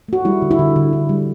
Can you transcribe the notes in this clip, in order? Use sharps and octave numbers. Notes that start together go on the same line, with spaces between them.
A3 F#4
G3 E4
D3
E4
D3
D3
D3
G3